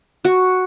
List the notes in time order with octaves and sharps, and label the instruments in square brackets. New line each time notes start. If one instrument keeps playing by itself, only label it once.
[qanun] F#4